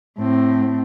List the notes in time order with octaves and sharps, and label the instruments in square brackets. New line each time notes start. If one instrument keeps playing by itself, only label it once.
[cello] A2 C4